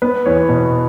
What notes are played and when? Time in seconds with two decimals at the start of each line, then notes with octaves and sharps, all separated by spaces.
0.02 B3 B4
0.25 E2 C#5
0.49 B2